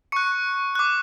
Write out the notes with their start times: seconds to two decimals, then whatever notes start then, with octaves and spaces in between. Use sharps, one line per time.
0.12 C#6 F#6 C#7
0.75 D6 F#6